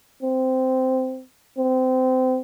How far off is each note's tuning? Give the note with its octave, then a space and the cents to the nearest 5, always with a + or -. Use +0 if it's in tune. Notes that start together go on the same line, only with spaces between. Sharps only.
C4 -10
C4 -25